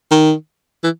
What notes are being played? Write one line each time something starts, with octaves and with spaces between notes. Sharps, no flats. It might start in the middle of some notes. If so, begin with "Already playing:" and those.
D#3
E3